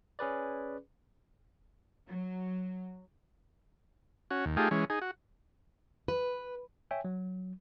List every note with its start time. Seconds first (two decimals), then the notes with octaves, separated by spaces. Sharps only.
0.19 C#4 G#4 B4 D5
2.09 F#3
4.31 C#4 F#4
4.45 D#2
4.57 A3 D#4 F4 G4 G#4
4.71 E3 G#3 C#4
4.90 D#4 G#4
5.02 F#4
6.08 B4
6.91 C#5 E5 G5 G#5
7.05 F#3